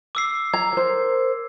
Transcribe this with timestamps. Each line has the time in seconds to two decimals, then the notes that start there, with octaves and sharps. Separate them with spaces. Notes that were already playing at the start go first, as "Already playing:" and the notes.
0.15 D6 E6 C7
0.54 A#5 G#6
0.73 A#4 C5